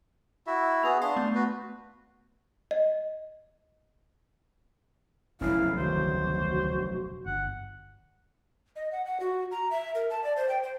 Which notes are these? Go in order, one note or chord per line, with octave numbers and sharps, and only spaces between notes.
E4 F#4 E5
B3 F#4 G#4 F7
D4 F5 C6 C#6 C7
A3 B3
F#4 B4
D#5
F1 B1 C#3 C#4 E4 F5
D2 D#3 F#4 C5
G1 F#5
D#5
F#5
F#5
F#4
A#5
E5
A#4
A5
D5
C5
G5
C5